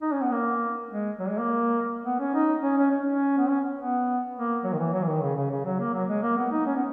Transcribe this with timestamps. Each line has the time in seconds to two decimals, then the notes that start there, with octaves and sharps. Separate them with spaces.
0.02 D#4
0.12 C#4
0.22 B3
0.32 A#3
0.90 G#3
1.19 F#3
1.28 G#3
1.38 A#3
2.05 B3
2.20 C#4
2.34 D#4
2.63 C#4
2.78 C#4
2.91 C#4
3.06 C#4
3.38 B3
3.49 C#4
3.78 B3
4.36 A#3
4.64 F#3
4.73 D#3
4.79 E3
4.93 F#3
5.03 E3
5.08 D#3
5.22 C#3
5.36 C#3
5.51 C#3
5.65 F#3
5.80 A#3
5.94 F#3
6.09 G#3
6.22 A#3
6.37 B3
6.52 D#4
6.66 C#4
6.76 B3